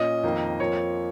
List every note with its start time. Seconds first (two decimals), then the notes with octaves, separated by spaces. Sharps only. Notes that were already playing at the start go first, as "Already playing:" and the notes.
Already playing: A#2 C#4 D#5
0.23 F2 D#3 A#3
0.60 F2 F3 A#3 C#5